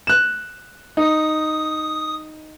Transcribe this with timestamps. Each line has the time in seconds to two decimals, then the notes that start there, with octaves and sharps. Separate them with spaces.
0.07 F#6 E7
0.97 D#4 D#6